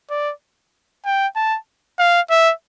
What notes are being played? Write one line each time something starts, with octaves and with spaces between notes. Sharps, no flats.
D5
G5
A5
F5
E5